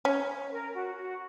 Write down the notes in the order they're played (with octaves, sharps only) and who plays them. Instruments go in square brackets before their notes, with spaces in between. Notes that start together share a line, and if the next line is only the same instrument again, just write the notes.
[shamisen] C#4 [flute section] C#5
[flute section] A#4
F#4
F#4